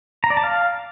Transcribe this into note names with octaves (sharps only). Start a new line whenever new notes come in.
A#5
D5
A5
F5